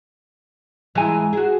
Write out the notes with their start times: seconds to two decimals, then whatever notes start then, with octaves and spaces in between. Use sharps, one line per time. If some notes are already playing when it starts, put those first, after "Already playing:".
0.95 E3 G#3 E4 G#5 A#5
1.33 F#4 G#4